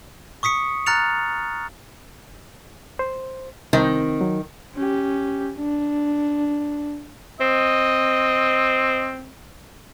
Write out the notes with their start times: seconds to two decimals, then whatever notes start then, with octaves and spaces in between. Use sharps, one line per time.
0.43 C#6 D#6 B6 C#7
0.86 A#5 F6 F#6 A6 C#7 F7
2.99 C5
3.73 C2 D#3 C4
4.21 F#3
4.76 C#4 G4
5.58 D4
7.41 C4 D#5